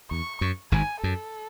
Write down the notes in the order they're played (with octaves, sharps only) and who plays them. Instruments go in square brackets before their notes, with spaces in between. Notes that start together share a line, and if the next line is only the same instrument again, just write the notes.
[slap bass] E2 [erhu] C#6
[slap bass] F#2
[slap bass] G#1 G#2 [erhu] G#5
[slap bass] F#2 [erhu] A4